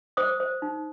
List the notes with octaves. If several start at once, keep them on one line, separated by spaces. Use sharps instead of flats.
C5 D#6
C5
D#4